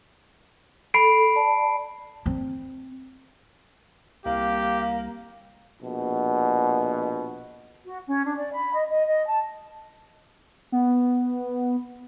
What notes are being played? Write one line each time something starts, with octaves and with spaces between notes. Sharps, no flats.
A4 B5 C7 D7
D5 A5
C4
C2 A#3 G4 F5
A#1 B2
F#4
C#4
D4
D5
B5
D#5
D#5
D#5
A5
B3